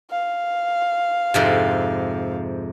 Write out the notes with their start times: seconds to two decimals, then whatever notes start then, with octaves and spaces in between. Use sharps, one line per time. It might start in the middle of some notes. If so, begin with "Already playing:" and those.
0.11 F5
1.34 F2 G#2 C3